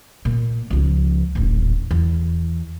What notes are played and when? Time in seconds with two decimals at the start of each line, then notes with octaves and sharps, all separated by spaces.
0.25 A#2
0.70 C#2 F3
1.35 D#1 A1
1.91 E2